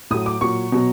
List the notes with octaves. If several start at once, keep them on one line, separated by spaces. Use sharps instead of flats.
A2 F#3 D#6
D6
A#2 F#3 C#6
B2 F#3